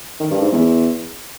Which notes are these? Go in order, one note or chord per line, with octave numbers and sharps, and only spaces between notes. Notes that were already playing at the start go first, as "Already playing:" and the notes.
D#3
G2
G#2
E2